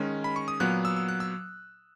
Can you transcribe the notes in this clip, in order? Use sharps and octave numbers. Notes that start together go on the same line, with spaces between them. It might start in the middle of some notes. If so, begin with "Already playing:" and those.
Already playing: D#3 G#3 C#4
B5
C#6
D#6
A#2 F#3 B3 F#6
E6
E6
F#6
E6